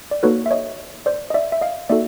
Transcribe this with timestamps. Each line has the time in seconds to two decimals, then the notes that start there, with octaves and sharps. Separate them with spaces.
0.11 D5
0.23 A#3 D#4 F#4 A4 B4 C#5
0.46 E5
0.51 C#5 D#5
1.06 C5 D5
1.30 D#5
1.34 D5 E5
1.52 E5
1.61 D#5 F5
1.89 A#3 D#4 F#4 A4 D5 E5